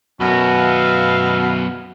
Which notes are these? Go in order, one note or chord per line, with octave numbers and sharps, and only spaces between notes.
F#2 B2 B3 C#4 E4 A#4
E5 F5